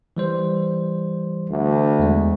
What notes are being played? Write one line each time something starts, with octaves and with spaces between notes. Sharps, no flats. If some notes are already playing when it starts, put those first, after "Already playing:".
E3 G3 C5
D2
E2 G#3